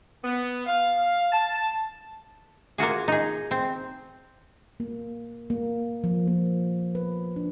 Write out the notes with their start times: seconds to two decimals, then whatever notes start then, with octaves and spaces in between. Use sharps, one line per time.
0.24 B3
0.67 F5
1.33 A5
2.78 A#3 F4 F#4 G#4
3.08 D#4 G#4
3.51 C4
4.80 A#3
5.50 A#3
6.04 F3
6.27 A#3
6.95 B4
7.36 D4